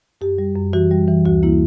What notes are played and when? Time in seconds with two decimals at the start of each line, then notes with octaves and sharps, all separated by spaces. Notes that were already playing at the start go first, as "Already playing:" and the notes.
0.21 F#2 G4
0.38 G3
0.55 F#2
0.73 E3 F#4
0.91 G3
1.08 E3
1.25 D2 F#4
1.43 A#3 E4